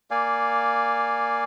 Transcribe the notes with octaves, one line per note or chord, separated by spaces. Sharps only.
A#3 D5 F5 G#5